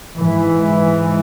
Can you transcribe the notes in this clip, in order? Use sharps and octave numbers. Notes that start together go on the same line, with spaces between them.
G#2 E3